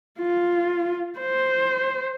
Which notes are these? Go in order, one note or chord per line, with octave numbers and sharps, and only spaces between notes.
F4
C5